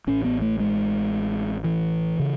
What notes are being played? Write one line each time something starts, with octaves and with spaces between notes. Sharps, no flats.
A1 A2 C#4
B3
A3
G#3
E3
C#3